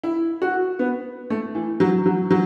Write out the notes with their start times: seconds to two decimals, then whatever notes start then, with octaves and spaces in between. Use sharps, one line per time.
0.03 E4
0.42 F#4
0.79 B3
1.30 A3
1.55 E3
1.80 F#3
2.06 F#3
2.31 F#3